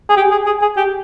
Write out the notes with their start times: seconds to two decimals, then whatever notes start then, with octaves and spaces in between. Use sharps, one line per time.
0.10 G#4
0.17 G4
0.31 G#4
0.46 G#4
0.62 G#4
0.77 G4